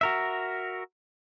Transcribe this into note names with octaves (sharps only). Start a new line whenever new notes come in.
F#4 A#4 E5